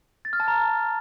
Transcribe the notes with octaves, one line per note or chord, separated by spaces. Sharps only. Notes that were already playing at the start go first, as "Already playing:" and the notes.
A6
F6
A5
A#5